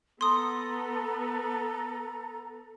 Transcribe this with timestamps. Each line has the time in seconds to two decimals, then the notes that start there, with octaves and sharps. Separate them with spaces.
0.21 B3 A4 B4 A#5 C6 D#6